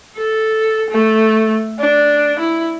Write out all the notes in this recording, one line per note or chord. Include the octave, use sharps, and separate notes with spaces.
A4
A3
D4
E4